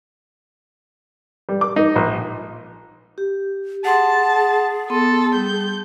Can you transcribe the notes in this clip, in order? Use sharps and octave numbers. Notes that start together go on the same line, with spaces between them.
G3
D6
D#4
A#1
G4
G#4 F#5 A5 C6
B3 A4 C6
G3 G6